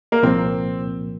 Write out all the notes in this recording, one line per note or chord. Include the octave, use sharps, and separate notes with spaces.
A#3
C2 A#2 F3 A#3 C4